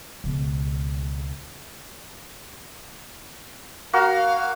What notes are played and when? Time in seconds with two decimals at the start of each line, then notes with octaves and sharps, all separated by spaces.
0.24 C#2 B2
3.93 A#3 F#4 F5